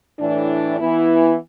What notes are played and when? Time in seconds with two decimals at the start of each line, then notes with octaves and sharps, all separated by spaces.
0.19 A2 E3 D4
0.77 E3 B3 E4